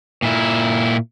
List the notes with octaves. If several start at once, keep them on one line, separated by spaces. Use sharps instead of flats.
A#2 E4